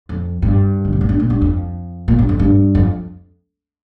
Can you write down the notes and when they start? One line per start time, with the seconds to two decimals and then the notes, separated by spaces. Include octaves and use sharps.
0.09 F2
0.42 G2
0.85 D#3
0.92 C3
1.01 A#2
1.09 G2
1.20 A#2
1.30 G2
1.41 F2
2.08 A#2
2.19 G2
2.29 F2
2.39 G2
2.75 F2